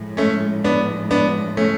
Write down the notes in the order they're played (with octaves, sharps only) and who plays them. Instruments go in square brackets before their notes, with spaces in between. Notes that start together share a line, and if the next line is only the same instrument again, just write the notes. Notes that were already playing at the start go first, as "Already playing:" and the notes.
Already playing: [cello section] A2 F3 G#3
[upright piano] A3 C#4
B3 D4
B3 D4
A3 C#4